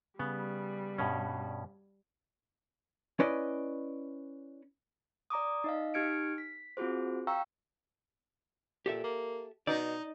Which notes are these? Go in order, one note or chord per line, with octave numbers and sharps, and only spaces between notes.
C#3 G3 B3
G2 B2 C#4
C#4 E4 B4 D5 D#5
D5 A#5 D6 D#6
D#4 D#5 F5
D#4 G4 F6 G#6 C#7 D7
B6
C4 F4 F#4 G#4 C5
F5 G5 A#5 C#6 E6
A#2 G4 A4 E5
A#3
B2 D#4 D5